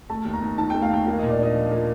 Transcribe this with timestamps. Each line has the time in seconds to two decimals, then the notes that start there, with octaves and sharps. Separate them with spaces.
0.10 A3 A5
0.25 D#2
0.33 A#5
0.42 D#2
0.58 D#3 A5
0.70 A3 G5
0.82 F5
0.90 D#2 G5
1.06 A#3 F5
1.19 A#2 D#5
1.30 D5
1.38 D4 D#5
1.55 F3
1.72 A#3